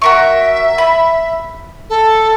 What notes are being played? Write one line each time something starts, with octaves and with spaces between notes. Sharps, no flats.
F#4 A#4 E5 C#6
B5
A4